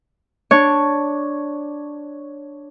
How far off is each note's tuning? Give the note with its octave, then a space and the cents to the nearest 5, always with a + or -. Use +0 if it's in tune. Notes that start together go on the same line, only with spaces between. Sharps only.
D4 +0 C#5 +0